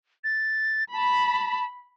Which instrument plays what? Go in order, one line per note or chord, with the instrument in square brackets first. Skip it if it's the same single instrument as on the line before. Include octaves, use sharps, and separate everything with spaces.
[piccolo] A6
[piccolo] A5 [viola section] B5